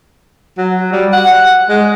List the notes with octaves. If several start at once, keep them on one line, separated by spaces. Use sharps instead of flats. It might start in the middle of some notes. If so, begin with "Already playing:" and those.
F#3
G3
F#5
G#3